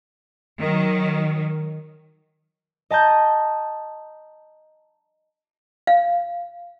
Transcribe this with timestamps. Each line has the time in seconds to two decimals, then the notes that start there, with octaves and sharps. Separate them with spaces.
0.59 D#3 F#3
2.90 D#5 A5 A#5 G6
5.87 F5